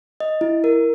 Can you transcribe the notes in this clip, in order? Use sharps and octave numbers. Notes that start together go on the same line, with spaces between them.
D#5
E4
A#4